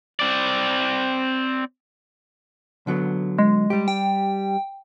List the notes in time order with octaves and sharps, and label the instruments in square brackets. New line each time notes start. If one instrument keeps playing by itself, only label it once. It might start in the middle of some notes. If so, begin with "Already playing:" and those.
[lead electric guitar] C4 D5
[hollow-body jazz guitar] D3 F#3 B3
[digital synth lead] G#3
[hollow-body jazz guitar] G3 G4
[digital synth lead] G5